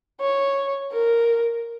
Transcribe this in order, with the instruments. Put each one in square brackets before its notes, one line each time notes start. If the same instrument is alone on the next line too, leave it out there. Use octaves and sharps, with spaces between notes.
[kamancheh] C#5
A#4